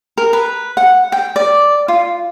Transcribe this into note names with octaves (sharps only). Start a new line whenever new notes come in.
A#4
B4
F#5
G5
D5
F4